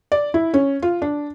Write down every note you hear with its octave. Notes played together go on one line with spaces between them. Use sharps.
D5
E4
C#4
F4
D4